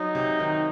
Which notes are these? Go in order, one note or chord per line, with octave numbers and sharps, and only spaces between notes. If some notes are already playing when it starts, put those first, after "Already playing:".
Already playing: F#3 D#4
C3
D#3